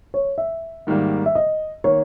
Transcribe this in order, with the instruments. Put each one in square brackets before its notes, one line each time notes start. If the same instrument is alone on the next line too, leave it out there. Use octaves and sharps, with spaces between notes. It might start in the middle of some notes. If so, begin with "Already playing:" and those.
[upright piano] C#5
E5
[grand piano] G#2 D#3 G3 A#3
[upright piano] E5
D#5
[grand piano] D#3 A#3 [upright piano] C#5